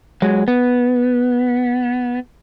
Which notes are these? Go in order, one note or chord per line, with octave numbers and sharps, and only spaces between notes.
F#3 G#3
B3